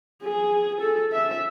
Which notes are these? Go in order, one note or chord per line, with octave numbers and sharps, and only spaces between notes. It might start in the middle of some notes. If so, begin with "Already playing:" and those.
G#4
A4
E5